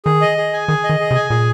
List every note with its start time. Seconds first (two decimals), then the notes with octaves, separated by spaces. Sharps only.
0.05 D#3 G#4
0.21 D#5
0.38 G#4
0.53 G#5
0.68 D#3 G#4
0.84 D#5
0.89 D#3
1.00 G#4
1.11 C3
1.15 G#5
1.30 A#2 G#4